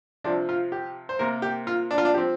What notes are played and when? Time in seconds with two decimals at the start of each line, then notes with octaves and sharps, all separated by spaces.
0.24 C3 F3 C4 D4
0.49 F4
0.72 G4
1.09 C5
1.19 C3 A#3 A#4
1.42 G4
1.67 F4
1.91 D4
1.98 F4
2.05 D4
2.14 F3 C4 G4